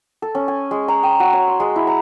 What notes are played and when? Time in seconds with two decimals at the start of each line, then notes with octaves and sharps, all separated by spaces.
0.22 A4
0.35 C#4
0.48 G#5
0.71 G#3
0.88 A#5
1.03 G5
1.20 F#4
1.33 C#5
1.48 C6
1.60 G#3
1.76 E4
1.87 A#5